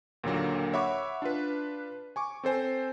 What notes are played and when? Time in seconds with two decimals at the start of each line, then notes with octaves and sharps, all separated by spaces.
0.24 D#2 A#2 D3 F#3 A#3
0.73 C#5 E5 F#5 B5 C#6 D6
1.22 D4 F4 B4
2.16 G#5 C#6 D6
2.44 C4 A4 C5 G#5